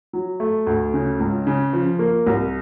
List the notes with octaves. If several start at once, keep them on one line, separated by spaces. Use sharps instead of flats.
F#3
A3
D2
C#3
C#2
C#3
F3
A#3
C2